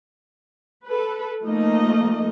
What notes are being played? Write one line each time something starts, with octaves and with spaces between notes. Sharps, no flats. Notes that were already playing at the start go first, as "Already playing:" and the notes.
A4 B4
F3 A3 A#3 D#4 D#5